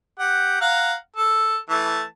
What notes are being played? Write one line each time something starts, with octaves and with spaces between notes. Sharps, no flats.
G4 F#5
F5 F#5 A#5
A4
E3 A3 A5